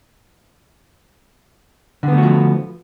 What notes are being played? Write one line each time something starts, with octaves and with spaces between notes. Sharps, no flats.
D3 F3 A3 B3 F#4